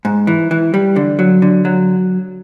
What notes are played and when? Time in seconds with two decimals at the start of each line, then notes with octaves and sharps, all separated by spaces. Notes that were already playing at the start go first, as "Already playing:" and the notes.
0.05 G#2
0.27 E3
0.51 E3
0.74 G3
0.96 D3
1.19 F#3
1.42 D3
1.65 F#3